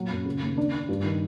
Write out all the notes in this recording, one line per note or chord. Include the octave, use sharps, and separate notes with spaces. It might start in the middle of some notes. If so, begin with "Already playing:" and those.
Already playing: A#2 F#3
F#2
C#3
D#2
D4
D4
G2
D#3